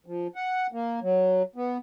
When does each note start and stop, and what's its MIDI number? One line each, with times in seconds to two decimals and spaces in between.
0.06 0.27 53
0.35 0.67 78
0.72 1.00 58
1.02 1.43 54
1.56 1.77 59